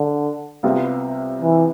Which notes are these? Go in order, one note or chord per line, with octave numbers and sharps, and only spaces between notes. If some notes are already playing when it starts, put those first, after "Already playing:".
Already playing: D3
C2 C3 G3 B3 F4
E3